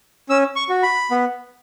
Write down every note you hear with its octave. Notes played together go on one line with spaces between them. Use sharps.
C#4 E6
C#6
F#4
B5
B3